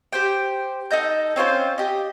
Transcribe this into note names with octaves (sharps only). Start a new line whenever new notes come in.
G4 C5 G5
D#4 A4 D#5 G6
C4 C#4 F4 C5
G4 D#5